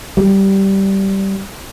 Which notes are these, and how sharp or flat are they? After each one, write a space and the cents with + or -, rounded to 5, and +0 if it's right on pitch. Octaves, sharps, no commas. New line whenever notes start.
G3 -10